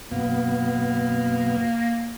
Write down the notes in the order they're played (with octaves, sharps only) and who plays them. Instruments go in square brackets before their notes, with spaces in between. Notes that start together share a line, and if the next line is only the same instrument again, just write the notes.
[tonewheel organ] F#2 B2 B3 [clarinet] A#3